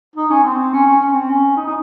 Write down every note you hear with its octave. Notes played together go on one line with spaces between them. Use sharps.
D#4
C#4
C4
C#4
C#4
C#4
C4
C#4
D#4
D#4